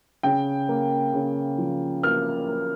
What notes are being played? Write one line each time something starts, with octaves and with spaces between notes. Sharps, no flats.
C#3 G5
A#3
C#3
F3
A#3 F6
A#3